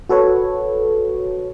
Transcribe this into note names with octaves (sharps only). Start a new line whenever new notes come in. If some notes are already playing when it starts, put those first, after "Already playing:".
F#4 A4 B4 C#5